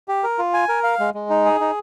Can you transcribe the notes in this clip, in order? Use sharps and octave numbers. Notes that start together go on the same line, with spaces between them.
G4
A#4
F4
G#5
A#4
F5
G#3
G#3
D#4
G#4
D#4